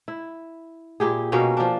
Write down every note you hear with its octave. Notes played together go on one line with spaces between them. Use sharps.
E4
A#2 E4 G4 G#4
B2 A#3 C#4 D#4
F3 D4